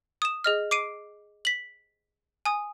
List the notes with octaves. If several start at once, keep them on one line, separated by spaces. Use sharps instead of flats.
D#6 E7
G#4 D#5 F6
D6 C7 D7 D#7
B6 F#7
G#5 D#6